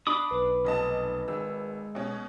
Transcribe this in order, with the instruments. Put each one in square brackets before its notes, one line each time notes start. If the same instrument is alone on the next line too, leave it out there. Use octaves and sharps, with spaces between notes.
[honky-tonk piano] D4 [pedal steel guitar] B5 D6 D#6
[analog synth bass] B1 [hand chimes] B4
[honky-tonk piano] F1 D#5 A5
[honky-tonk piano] G#1 E6 [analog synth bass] G#3
[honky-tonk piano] B2 C#4